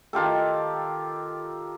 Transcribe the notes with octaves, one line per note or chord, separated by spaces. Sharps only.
D#3 F4 G4 A4